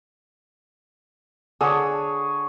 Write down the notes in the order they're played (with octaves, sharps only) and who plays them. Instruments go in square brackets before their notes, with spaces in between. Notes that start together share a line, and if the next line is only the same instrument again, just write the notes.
[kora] D3 A4 D5 [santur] G#4 C#5